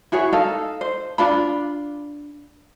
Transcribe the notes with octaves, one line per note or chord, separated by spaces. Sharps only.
E4 F#4 G#4 C#5
D#4 A4 F5
C5
D4 F4 B5